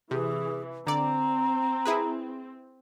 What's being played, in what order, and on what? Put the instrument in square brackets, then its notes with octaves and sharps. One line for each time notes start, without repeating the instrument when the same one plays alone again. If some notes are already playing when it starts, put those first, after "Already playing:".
[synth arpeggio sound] C3 [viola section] E3 [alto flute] G#4
[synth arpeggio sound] D3 D5 [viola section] C4 [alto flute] A#5
[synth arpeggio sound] E4 G#4 B4